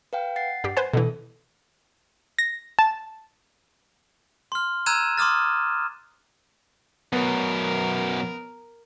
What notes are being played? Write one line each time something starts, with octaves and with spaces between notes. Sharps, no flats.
B4 F5 G5
F#5 A6 C7
G2 G4
B4 C5 G#5
B2 D3 E3 A4
A#6
A5
C6 F6
A#5 E6 F#6 G#6 D#7 E7
C6 D6 D#6 F6 A6
F#2 B2 B3 A#4